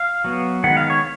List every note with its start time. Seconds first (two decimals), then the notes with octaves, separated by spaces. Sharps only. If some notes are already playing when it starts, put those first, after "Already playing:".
Already playing: F5
0.24 F#3 B3
0.64 D#3 G#3 B3 F#5
0.77 F5
0.90 C#5